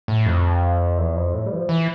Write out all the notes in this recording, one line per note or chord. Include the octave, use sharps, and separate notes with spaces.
A2
F2
E2
F2
A2
G3
E3
F3
E3